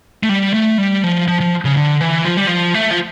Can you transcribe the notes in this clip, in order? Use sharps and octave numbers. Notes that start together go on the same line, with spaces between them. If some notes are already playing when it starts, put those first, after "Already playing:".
A3
G3
A3
G3
F3
F3
F3
C#3
D3
E3
F3
G3
F3
A3
F3